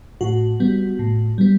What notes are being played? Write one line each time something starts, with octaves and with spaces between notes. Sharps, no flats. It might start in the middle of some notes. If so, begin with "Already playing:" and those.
A2 F#4
G3 B3
A2
G3 B3